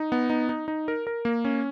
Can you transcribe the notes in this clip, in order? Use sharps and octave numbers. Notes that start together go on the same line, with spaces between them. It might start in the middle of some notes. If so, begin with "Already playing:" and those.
Already playing: D#4
B3
D#4
D#4
D#4
A#4
A#4
A#3
C#4